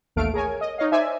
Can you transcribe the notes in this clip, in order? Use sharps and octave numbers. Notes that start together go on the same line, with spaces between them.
A1 D#2 A3 F5 D7
G#4 A#4 C#5 G#5
D#5
D#4 C#5 D#5 F5
D#4 C5 D5 E5 G#5